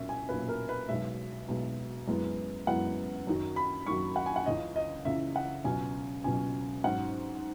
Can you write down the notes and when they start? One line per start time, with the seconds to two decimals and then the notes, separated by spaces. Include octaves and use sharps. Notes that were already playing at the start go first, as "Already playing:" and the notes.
Already playing: B1 A#2 A#3 C#4 E5
0.09 G#5
0.29 B1 A#2 A#3 C#4 B4
0.49 A#4
0.69 B4
0.88 B1 B2 G#3 E5
1.48 B1 B2 G#3
2.07 F#2 E3 G#3 B3
2.67 F#2 E3 G#3 B3 F#5
3.27 F#2 D#3 F#3
3.56 B5
3.86 F#2 D#3 F#3 C#6
4.16 F#5
4.26 G#5
4.36 F#5
4.46 C#2 C#3 E3 D#5
4.76 D#5
5.05 C#2 C#3 E3 E5
5.36 F#5
5.64 C#2 B2 F#3 C#4 G#5
6.24 C#2 B2 F#3 C#4 G#5
6.84 G#2 F#3 C#4 F#5